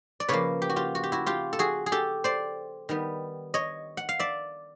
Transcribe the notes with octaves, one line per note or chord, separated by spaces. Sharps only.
D5
C#3 F3 A#3 B4 C#5
G4
F#4
F4 G4
F#4
G4
E4 F#4
F4 G4
A4
F#4 G#4
G#4
G4 A4
C5 D5
D#3 G3 B3
C#5 D#5
F#5
F5
D5 E5